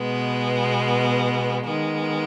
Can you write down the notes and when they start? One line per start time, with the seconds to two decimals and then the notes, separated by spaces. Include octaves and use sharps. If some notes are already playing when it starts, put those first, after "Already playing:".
Already playing: B2 G#3 B3
1.66 D#3 G#3 B3